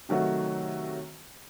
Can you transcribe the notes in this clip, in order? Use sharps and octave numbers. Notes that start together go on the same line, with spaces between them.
C3 D#3 F#3 A3 F#4